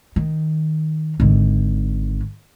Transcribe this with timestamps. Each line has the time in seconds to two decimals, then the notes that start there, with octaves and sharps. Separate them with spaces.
0.16 D#3
1.20 G#1 D3